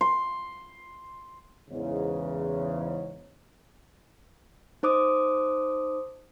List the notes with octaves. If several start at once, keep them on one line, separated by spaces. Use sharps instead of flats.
C6
E2 G#2 C#3
D#4 C5 D6 D#6